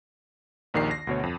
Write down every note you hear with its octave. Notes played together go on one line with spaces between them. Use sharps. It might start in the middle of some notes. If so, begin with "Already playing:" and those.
A#1 D#2 D#3 D5 C7
A#6
D2 B2 C#5
F2